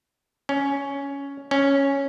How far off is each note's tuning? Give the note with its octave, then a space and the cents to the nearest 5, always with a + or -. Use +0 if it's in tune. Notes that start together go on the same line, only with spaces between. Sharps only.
C#4 +10
C#4 +0